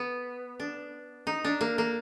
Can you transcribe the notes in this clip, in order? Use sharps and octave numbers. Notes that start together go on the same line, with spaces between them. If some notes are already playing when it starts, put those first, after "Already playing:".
Already playing: B3
D4
D#4
D4
A#3
A#3